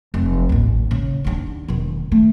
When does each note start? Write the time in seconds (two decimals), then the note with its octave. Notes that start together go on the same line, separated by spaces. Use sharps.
0.14 F1
0.49 A1 D#2
0.91 C#3
1.24 D#2 D4
1.68 E1 D#3
2.12 A3